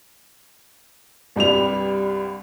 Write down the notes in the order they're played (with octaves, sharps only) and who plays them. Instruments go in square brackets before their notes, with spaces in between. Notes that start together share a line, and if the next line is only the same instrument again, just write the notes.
[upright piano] C2 G2 G3 F7